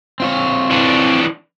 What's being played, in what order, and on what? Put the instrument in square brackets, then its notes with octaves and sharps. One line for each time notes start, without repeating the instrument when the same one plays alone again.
[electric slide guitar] C4 F4 C#5
[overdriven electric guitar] E3 D4